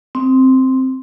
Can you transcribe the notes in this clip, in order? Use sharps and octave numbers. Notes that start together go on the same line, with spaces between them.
C4